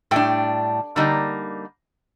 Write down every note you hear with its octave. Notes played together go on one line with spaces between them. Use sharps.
A2 G3 D4 G5
D3 G3 A#3 D#4